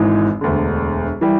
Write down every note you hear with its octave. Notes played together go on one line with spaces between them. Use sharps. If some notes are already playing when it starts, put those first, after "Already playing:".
Already playing: G#1 G#2 E3 G#3
E1 D2 D3
E3 G3